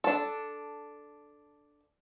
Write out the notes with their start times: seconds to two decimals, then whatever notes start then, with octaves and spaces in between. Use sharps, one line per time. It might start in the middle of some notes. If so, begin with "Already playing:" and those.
0.04 D4 A4